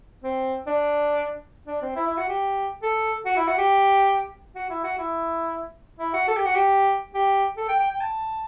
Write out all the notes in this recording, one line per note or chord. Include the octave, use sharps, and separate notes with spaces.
C4
D4
D4
C4
E4
E4
F#4
G4
A4
F#4
E4
F#4
G4
F#4
E4
F#4
E4
E4
F#4
A4
G4
F#4
G4
G4
A4
G5
G5
G5
A5